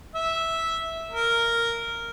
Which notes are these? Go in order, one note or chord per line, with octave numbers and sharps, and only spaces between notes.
E5
A#4